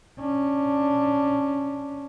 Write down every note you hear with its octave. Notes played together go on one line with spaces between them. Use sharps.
C#4 D4